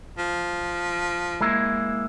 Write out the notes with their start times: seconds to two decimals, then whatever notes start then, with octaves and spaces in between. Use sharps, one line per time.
0.18 F3
1.41 G#3 A#3 E4